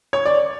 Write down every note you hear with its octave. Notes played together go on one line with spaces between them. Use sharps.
C#5
D5